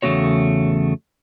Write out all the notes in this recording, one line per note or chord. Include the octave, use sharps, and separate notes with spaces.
E2 C#3 A3 B3 F#4 C#5